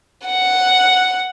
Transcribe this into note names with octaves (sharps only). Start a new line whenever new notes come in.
F#5